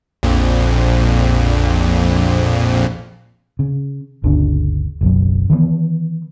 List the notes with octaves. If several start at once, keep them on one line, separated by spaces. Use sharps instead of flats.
A#1 F2 A#2
C#3
G1 D2 C#3 D4
F#1 B1 F#2
D#3 E3 G3 B3